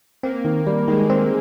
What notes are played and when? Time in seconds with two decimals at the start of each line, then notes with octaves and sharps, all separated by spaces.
0.23 A#3 C4
0.45 D#3
0.67 G3
0.88 D#3 G#3
1.10 C4